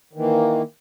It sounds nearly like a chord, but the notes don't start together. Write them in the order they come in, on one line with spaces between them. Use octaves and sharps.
D#3 E3 A#3